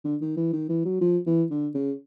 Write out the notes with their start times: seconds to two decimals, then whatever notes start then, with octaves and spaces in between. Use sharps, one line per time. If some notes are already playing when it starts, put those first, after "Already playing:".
0.04 D3
0.21 D#3
0.37 E3
0.53 D#3
0.69 E3
0.85 F#3
1.01 F3
1.26 E3
1.51 D3
1.75 C#3